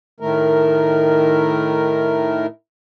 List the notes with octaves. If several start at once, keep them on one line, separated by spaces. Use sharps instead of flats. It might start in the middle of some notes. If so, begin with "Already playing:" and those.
A2 D#3 A3 A#4